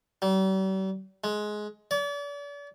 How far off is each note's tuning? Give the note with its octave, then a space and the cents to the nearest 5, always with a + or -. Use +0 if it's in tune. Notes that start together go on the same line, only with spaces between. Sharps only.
G3 -45
G#3 +15
D5 -40